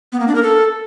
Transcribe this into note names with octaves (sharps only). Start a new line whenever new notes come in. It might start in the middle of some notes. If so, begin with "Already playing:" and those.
B3
A#3
D4
A#4
A4